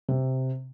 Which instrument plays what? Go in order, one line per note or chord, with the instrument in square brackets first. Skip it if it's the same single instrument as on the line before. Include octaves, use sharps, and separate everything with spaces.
[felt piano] C3